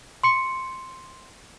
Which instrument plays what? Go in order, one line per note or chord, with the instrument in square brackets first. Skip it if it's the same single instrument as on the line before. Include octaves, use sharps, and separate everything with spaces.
[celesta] C6 C#7